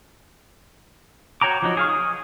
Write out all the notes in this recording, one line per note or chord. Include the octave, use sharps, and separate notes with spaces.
F#4 C#5 G5 A#5 D6
F3 F#3 D#4
G#4 F5 C#6
D#6